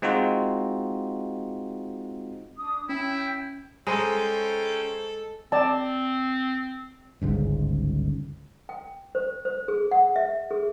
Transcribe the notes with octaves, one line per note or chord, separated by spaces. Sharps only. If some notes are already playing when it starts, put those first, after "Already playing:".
G#3 C4 D#4 F4 F#4
D4 D#6
C#4 E4 G5
G#3 C#4 A4 C5 G5 A#5 B5
C4 D5 A5
G1 C#2 G#2
G5
C5
C5
G#4
F#5
E5
G#4